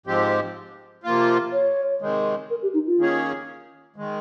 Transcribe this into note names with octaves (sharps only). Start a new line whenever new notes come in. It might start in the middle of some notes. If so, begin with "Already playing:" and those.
G#2 F3 G#3 C4 G4
C3 F3 A#3 F4
C#5
C3 D#3 G#3
A#4
G4
D#4
F4
D#3 A#3 C#4 G#4 C#5
D#3 G#3